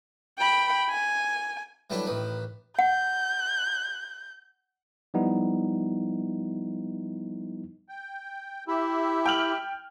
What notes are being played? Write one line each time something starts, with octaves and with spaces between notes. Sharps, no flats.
G5 B5
G#5
E3 F#3 G3 A3 D4 E4
A1 D#3 B4
F#5 G6
F3 G3 B3 D#4 E4
G5
E4 G4 E5
G5 F6 F#7